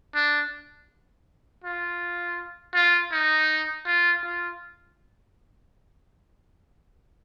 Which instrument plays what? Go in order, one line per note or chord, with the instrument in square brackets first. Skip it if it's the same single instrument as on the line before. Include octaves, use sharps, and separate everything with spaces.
[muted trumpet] D4
F4
F4
D#4
F4
F4